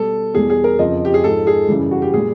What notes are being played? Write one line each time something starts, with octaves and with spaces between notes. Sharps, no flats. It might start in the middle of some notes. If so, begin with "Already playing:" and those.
Already playing: B2 G3 A4
E2 B2 G3 G#4
G#4
A#4
F2 C#3 F3 D#5
G4
G#4
G#2 F3 A4
G#4
F#2 C#3 E3 G3
F#4
G4
A#2 G3 G#4